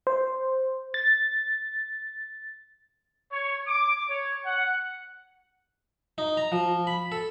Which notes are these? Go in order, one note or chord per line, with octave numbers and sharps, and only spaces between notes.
C5
A6
C#5
D6
C#5
F#5
D#4
A#5
F3
B5
A4